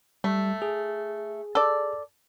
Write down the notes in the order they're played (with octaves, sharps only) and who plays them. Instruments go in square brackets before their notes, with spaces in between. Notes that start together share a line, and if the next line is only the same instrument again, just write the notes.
[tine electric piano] G3 [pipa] A3
[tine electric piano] G#4
[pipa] A4 D5